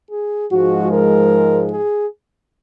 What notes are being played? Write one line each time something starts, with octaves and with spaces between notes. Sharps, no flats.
G#4
G#2 F3 G#3 F#4
A#4
G#4